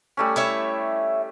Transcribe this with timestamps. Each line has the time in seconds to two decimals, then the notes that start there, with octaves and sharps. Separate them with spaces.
0.17 G3 A3 C#4
0.36 E4 C#5 E5